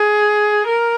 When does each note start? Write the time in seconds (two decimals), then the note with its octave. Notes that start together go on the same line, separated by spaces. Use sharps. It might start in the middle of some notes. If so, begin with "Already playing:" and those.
Already playing: G#4
0.67 A#4